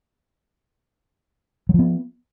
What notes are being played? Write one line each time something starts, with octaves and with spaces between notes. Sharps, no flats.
F3 F#3 B3